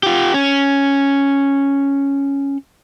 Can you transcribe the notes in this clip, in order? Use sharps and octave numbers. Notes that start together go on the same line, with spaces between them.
F4 G4
C#4